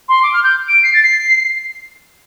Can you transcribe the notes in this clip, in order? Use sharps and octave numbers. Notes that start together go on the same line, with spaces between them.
C6
D6
F6
G6
D7
C7
A6
C7